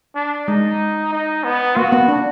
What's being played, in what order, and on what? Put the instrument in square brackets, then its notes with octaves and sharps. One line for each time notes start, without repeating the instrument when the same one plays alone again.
[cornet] D4
[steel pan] G#3 [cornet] D#4
[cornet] D#4
B3
[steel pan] A#3 [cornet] F#4
[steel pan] B3
D4